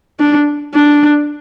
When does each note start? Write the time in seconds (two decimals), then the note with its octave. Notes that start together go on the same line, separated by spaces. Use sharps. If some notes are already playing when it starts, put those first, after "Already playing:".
0.20 D4
0.74 D4